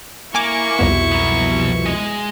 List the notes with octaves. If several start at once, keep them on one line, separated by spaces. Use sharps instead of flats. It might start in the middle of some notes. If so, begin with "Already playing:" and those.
A#3 E4 G#5 C#6 D6
C2 F2 B2
F#3 B3
G#3 D#5